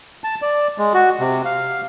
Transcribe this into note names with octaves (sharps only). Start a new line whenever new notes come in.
A5
D5
G#3
F#4
C3
F5